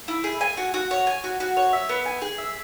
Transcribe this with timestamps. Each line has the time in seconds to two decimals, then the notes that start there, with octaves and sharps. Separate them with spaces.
0.08 E4
0.24 G#4
0.41 G#5
0.57 F#4
0.74 F#4
0.91 C#5
1.07 G#5
1.24 F#4
1.40 F#4
1.57 C#5
1.73 E5
1.89 B3
2.05 G#5
2.22 G#4
2.38 E5